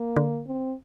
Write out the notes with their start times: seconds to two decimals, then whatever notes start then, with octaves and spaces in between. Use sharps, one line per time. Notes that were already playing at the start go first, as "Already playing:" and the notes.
Already playing: A#3
0.16 D3
0.47 C4